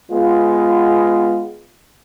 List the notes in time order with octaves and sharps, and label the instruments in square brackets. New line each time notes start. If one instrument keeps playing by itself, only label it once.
[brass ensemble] G#3 B3 F4